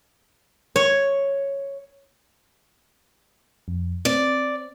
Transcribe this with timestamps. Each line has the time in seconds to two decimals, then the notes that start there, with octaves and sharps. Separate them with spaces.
0.76 C#5
3.68 F2
4.05 C4 D5